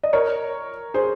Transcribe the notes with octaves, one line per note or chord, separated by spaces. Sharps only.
D#5
A#4 C#5
G#4 C5